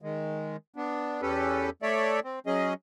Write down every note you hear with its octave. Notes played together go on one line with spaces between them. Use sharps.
D#3 G#3
B3 D4
E2 C#4 G4 A4 B4
A3 A4 C#5 D5 E5
C4
F#3 C#4 G#4 D#5